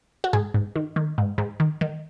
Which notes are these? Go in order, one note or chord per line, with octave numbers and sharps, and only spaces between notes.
F#4
G#2 G#4
G#2
D#3
D#3
G#2
G#2
D#3
D#3